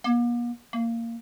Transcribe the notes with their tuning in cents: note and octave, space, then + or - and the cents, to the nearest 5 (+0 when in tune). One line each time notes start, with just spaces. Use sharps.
A#3 +45
A#3 -15